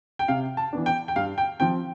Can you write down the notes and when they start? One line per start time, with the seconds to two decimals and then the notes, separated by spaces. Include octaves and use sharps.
0.19 G5
0.28 C3 F5
0.57 A5
0.73 E3 B3 D4
0.86 G5
1.08 G5
1.16 G2 F5
1.38 G5
1.60 F3 C4 G5